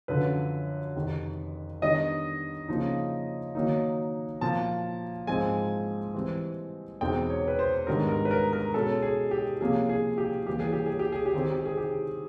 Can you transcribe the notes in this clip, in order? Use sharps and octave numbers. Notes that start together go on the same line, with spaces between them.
F#2 D3 F3 B4
F2 C3 D#3
D#3 G3 B3 D4 D#5
C#3 F3 A#3 D#4
D#3 F#3 A#3 D#4
A#2 F3 A#3 A5
G#2 F3 G#3 C4 D#4 G#5
E3 G3 C4
E2 B2 G#3 C4 D#4 G5
C#5
B4
C5
G#2 D#3 G3 B3 D4 A#4
A#4
B4
A#4
A#4
B2 G#3 C#4 A4
G#4
G4
C3 F3 A#3 C#4 G#4
G#4
G4
E3 G3 A#3 G4
G#4
G4
G#4
G4
G#4
G4
D#3 G#3 C4 D#4 G#4
G4
G#4
G4